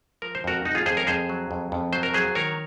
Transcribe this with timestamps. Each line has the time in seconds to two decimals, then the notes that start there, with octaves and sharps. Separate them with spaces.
0.22 F3 A#4
0.35 C5
0.44 F2 F#4 A#4
0.65 F2 D#4 F#4
0.75 F4 G#4
0.86 F2 G#4 C5
0.97 A#4 C#5
1.07 F2 G#4 C5
1.29 F#3
1.51 F2
1.72 F2
1.93 F#3 C5
2.03 A#4
2.14 F#3 G#4 C5
2.35 D#3 A#4 C#5